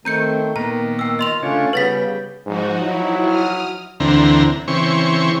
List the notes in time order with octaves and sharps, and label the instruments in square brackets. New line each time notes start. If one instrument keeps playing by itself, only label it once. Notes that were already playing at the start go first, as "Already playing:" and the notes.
[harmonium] D#3 A3 [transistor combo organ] C4 [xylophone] A#5 G6 C#7
[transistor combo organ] A#2 A#3 B3 [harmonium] D#3 [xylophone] A#5
[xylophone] G5 E6
[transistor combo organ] F4 [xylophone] D#5 C6 F7
[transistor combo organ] C#3 D4 C#5 [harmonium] A3 C#4 F4
[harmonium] C#3 B3 [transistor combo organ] G3 [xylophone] B4 A6 B6
[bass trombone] G#2 [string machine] F3 D#4 F#4
[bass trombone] F#3 [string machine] E4
[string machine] D#6 F6
[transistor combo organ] D2 D3 E3 C4 A#5
C#3 E3 C4 C#6